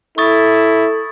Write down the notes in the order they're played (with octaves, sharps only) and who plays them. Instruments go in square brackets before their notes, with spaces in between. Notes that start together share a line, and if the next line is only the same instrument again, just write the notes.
[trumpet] E4 [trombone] A4 [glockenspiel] C#6 D#6 A6